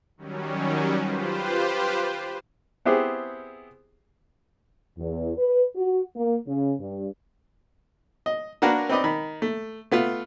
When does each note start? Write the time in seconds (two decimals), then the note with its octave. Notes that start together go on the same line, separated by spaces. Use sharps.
0.17 D#3 F#3 G3 C#4
1.01 F4 G4 B4 C5
2.85 B3 C4 E4 G4 G#4 C5
4.99 E2
5.38 B4
5.76 F#4
6.16 A#3
6.47 C#3
6.80 G2
8.26 D#5
8.62 A#3 D4 F#4 A#4 B4
8.89 C4 D#4 B4 D5 D#5
9.04 D#3 B5
9.42 A3
9.92 A3 B3 F4